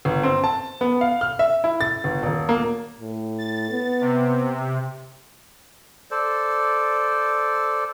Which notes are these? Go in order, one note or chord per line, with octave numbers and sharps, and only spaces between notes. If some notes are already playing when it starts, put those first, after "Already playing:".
G1
C4
A5
B3
F5
F6
E5
E4
A6
G1
D#1
A#3
A2
A6
B3
C3
A4 C5 D5